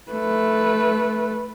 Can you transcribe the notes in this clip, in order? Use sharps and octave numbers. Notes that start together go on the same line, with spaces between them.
A3 B4